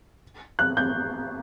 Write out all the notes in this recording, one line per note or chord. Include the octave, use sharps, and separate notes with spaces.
F#6
G6